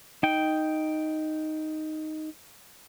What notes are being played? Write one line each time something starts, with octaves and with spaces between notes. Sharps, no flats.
D#4 G5